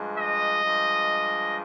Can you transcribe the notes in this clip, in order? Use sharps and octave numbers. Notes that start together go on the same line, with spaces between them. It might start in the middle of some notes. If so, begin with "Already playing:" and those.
Already playing: G2 F3 G#3
D#5
G2 F3 G#3